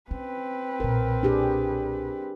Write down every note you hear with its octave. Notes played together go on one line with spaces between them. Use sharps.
C4 C#4 B4
B1 A#2 A#4
D4 G4 G#4